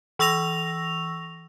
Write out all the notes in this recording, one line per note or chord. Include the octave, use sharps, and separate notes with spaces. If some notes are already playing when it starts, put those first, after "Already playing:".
E3 C#6 E6 A#6 F7